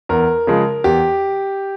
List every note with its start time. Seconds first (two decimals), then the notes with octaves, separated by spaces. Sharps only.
0.09 E2 A#4
0.47 C#3 F3 G#3
0.84 E2 G4